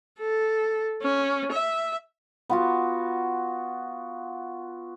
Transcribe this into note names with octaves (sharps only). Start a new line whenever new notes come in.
A4
C#4
E5
B3 F4 F#4